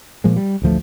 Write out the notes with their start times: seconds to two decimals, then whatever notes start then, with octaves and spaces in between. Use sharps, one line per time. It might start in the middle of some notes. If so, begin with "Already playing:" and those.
0.24 A#2 F3 G#3
0.36 G3
0.62 A1 D2 F3 A3